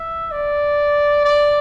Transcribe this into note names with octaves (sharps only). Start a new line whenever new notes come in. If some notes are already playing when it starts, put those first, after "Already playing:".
Already playing: E5
D5
D5